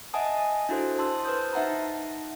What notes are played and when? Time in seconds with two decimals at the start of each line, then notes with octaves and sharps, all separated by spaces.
0.14 D#5 E5 F#5 G#5 A5 D#6
0.69 D4 E4 F#4 A4 C5
0.98 A5 C6 E6
1.25 B4 C5 A5 D#6 G6
1.53 D#4 E5 F#5 A5 A#5